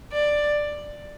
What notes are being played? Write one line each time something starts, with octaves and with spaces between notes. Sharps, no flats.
D5